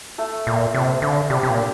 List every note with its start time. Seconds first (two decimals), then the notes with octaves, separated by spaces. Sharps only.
0.18 A3 A4
0.47 A#2
0.74 C3
1.02 D3
1.30 C3 G3 G4
1.43 C3
1.49 A#2
1.58 D4